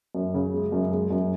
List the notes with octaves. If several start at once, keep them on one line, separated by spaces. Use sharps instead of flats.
F#2
C#3
G#3
F#2
G#3
F#2